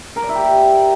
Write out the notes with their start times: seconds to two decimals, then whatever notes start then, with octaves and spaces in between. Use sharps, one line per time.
0.16 A#4
0.22 D5
0.29 E4
0.35 G4